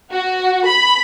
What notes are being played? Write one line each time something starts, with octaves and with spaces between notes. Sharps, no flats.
F#4
B5